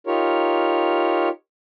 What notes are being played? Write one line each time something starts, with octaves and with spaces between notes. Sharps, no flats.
D#4 F4 G4 A#4 C#5